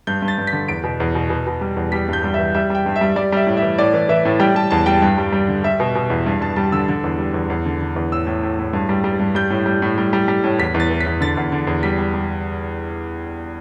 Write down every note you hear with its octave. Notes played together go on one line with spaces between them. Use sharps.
G2 G6
G2
A6
G2
B6
D3
E2 D7
B2
E2
B2
B2
B2
G3
E2
G3 B6
G2 G6
G3
E3 E5
G3 E5
G3 G5
G2
E5
G3
G3 D5
G3 E5
A2
E5
E3
A2 D5
E3
E3 E5
A2
G3 G5
G3 A5
E2 A5
G3 G5
G2
G3
G3
D3
G3 E5
B2
B2
E2
G2
G2 A5
G3 A5
D3 E6
D3
E2
G3
E2
E2
D3
D3
E2
A2 E6
A2
A2
A2
G2
G3
G3
G2
G3 G6
A2
G3
A2
G3
G3
G3
A2
E2 B6
E2
A6
E3
B6
E2
D3 A6
E2
D3
E2
G3 B6
G3
G3